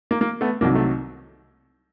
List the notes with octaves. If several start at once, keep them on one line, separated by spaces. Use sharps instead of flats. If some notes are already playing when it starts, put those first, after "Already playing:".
A#3
A#3
A3 B3
C2 C3 D#3 F#3 A#3
A3